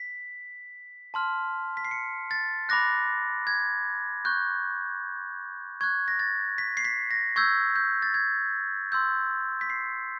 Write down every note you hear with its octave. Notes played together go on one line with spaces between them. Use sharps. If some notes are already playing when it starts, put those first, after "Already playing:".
Already playing: B6
A5 C6 F6
B6
C7
C#7
A6
B5 D6 F#6 A#6
G#6
C#6 F#6 G6
C#6 F#6 G#6
A#6
A6
B6
C7
B6
A#6
C#6 E6 G6 G#6
G6
A6
G#6
C6 E6 G6
B6
C7